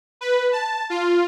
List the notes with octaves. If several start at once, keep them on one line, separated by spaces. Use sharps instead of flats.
B4
A5
F4